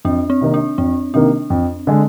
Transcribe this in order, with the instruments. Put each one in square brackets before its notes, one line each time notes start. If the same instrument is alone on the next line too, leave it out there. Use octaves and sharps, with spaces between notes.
[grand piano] F2 [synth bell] D4
[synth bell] C4
[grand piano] C3 D#3 A#3 D#4
[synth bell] D4
[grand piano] F2 [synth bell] C4
[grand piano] C3 D#3 A#3 D#4 [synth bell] D4
[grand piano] F2
D3 G#3